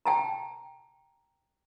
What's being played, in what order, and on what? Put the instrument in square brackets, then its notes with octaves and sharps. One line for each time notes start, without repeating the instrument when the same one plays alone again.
[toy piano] G5 A5 A#5